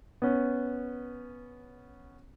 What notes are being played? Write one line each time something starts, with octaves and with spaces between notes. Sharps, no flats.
B3 C#4